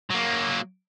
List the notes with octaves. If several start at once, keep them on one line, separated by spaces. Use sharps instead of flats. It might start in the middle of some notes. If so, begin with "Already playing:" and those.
F#3 A#3